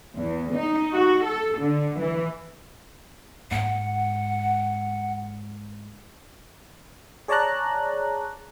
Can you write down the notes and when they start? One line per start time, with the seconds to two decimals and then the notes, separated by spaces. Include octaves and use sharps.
0.16 E2
0.55 D#4
0.93 F#4
1.24 A4
1.60 D3
1.99 E3
3.51 G#2 F#5
7.28 G#4 C#5 D5 A5 A#5 F#6